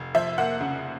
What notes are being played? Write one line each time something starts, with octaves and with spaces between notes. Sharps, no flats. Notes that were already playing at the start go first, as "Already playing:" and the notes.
Already playing: F1
F3 E5
A#3 F#5
C#3